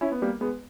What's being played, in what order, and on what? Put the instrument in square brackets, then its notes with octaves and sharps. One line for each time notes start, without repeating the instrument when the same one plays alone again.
[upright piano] C#4 E4
B3
G3 A#3
G#3 B3